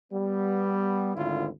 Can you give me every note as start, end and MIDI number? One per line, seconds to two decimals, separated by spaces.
0.12 1.15 55
0.12 1.15 59
1.15 1.48 32
1.15 1.48 38
1.15 1.48 50
1.15 1.48 51
1.15 1.48 64
1.15 1.48 65